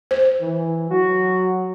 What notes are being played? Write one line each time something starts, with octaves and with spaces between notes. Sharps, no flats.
C5
E3
F#3 F#4